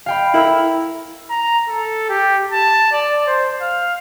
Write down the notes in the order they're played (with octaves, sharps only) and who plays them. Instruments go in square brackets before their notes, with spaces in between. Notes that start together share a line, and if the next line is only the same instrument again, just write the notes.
[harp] F5 G5 B5
[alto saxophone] E4 [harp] A#4 E6
[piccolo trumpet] A#5
A4
G4
A5
D5
C5
F5